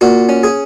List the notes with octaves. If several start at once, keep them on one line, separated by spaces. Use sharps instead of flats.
A#2 F#4
C#4
G#4